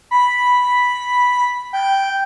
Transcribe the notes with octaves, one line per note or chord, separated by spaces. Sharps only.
B5
G5